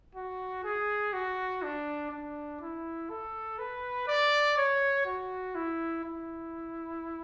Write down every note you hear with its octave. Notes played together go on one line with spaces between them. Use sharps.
F#4
G#4
F#4
D4
D4
E4
A4
B4
D5
C#5
F#4
E4
E4